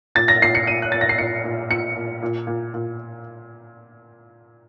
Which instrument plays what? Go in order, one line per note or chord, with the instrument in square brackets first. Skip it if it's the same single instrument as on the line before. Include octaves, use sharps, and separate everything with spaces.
[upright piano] A#2 A6
A#6
A#2 C7
C#7
A#2 D#7
F#6
A#2 A6
A#6
C7
A#2 C#7
A#2
A#2 C#7
A#2
A#2
A#2
A#2